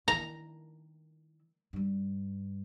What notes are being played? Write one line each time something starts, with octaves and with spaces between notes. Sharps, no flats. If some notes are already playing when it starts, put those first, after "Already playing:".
D#3 E4 A#5
G2 G3